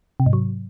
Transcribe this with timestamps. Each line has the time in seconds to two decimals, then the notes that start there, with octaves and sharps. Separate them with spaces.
0.20 C3
0.26 G#2
0.33 F#3